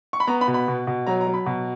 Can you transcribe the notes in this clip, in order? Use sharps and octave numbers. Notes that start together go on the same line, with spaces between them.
C#6
B5
B3 A#5
B5
B2
B5
B2
B2
F#3 A#5
A#5
F#3
B5
B2